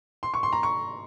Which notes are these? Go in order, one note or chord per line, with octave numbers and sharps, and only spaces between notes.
C6
C#6
C6
A#5
C#6